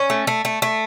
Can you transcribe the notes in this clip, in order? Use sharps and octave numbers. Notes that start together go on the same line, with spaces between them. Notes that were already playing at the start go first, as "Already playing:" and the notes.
Already playing: C#4
A3
A3
A3
A3